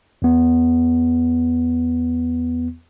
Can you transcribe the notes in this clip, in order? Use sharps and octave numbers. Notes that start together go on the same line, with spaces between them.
E2 B3